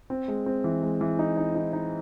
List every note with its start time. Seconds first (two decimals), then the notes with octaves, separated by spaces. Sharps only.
0.10 C4
0.28 G#3
0.46 C4
0.64 E3
0.83 G#3
1.01 E3
1.19 D#4
1.37 D#4
1.55 D#4
1.73 D#4